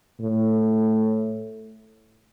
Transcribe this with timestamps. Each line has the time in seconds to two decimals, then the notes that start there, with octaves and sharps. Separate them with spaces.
0.21 A2